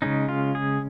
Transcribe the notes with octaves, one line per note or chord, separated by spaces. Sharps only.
C#3 G#3 C#4 D#4
F4
G#4